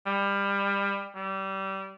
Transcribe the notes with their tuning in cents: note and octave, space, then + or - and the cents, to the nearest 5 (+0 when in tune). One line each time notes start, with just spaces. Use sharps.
G3 +25
G3 -25